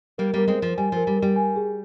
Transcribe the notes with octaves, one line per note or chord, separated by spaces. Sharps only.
G3 A#3 A#4
G3 A#3 A#4
G#3 C4
F3 A#4
G3 G#5
F3 A#4
G3
A#4
G3
G#5
G#4